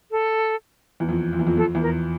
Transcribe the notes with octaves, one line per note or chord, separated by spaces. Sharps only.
A4
E2
F2
F2
E2
F2
F2 A4
E2
A#4